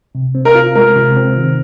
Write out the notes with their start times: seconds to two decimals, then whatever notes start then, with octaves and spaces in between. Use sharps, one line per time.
0.15 C3
0.35 C4
0.45 A#4
0.55 F4
0.75 G#3 A#4
0.96 C3
1.17 C4
1.36 D#3